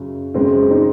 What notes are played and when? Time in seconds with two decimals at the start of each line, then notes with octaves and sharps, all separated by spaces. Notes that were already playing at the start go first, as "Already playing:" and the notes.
Already playing: F#2 C#3
0.34 F#2 C#3 G#3 C4
0.70 C4 D#4